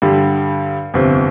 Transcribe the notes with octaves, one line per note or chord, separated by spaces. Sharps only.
G2 D3 G3
G1 F2 C3